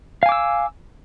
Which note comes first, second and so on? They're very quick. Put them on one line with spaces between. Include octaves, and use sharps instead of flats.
F5 G#5 D6 E6